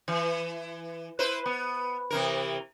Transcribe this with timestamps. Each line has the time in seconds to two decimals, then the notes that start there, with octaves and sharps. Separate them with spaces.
0.08 E3
1.19 E4 B4 C5
1.46 B3
2.10 C3 E3 A#4